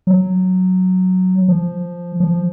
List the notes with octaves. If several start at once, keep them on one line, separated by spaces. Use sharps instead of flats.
F#3
F3
F3